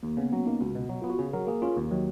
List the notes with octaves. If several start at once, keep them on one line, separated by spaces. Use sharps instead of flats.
D#2 A#3
C#3 B3
F#3 C#4
A#3 D#4
C#2 F#4
B2
F#3
B3 F4
F#4
C#3 G#4
F#3 A#4
A#3 G#4
C#4 F4
D#2 A#3
D#3 F#3